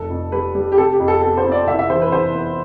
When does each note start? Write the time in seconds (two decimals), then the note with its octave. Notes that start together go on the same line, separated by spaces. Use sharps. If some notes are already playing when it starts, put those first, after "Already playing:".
Already playing: F1 A4
0.10 F2
0.32 G3 B4
0.55 G3
0.72 G4
0.77 C3 A4
0.93 G4
1.00 F2
1.08 A4
1.22 B3 A4
1.37 C5
1.44 F2
1.52 D5
1.67 C2 E5
1.79 E5
1.90 E3 C5
2.02 B4
2.12 C2 C5
2.34 B3